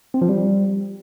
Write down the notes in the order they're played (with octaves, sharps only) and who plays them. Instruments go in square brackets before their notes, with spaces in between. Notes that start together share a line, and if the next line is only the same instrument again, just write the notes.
[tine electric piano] C4
F3
G3